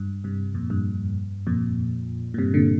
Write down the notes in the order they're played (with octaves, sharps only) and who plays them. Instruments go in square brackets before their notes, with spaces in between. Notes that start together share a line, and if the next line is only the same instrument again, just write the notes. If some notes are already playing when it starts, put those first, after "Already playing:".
Already playing: [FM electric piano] G2
G2 C3
F2 A#2
G2
F2 A#2
A#2
G2 C3
A#2 D3